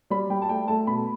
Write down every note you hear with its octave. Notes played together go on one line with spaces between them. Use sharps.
G3 B5
G3 G5
A5
A3 G5
A3 A5
B2 B5